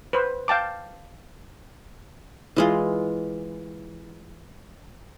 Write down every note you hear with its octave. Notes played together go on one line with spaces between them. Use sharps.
B4 C5
F5 G5 A5 D6
E3 G#3 F4